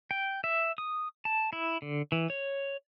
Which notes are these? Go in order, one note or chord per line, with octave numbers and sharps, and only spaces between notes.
G5
E5
D#6
A5
E4
D3
E3
C#5